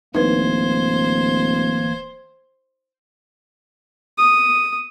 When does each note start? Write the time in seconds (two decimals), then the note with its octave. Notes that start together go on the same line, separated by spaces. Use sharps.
0.15 D1 E3 A#3 D#4 B4 C5 G#6
4.18 D#6